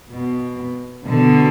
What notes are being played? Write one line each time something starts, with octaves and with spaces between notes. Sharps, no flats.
B2
B2 D3